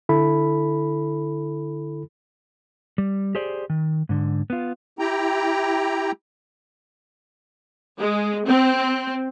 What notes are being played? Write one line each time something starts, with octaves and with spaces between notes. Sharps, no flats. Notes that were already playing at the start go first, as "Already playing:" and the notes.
D3 E4 A4 B5
G3
G4 G#4 C5 D5
D#3
G#2 D3
B3 F4
E4 G4 G5 A#5
G#3
C4